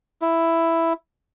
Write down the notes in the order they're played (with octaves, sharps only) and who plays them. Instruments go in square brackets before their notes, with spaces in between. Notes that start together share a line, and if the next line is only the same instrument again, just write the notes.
[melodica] E4